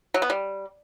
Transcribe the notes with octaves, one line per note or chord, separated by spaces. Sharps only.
F#3
B3
G3